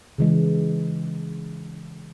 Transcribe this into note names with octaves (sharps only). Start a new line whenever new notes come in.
C#3 E3 G#3